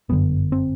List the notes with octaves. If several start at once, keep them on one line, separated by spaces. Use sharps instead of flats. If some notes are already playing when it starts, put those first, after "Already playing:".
G1 F#2 D3 B3
C4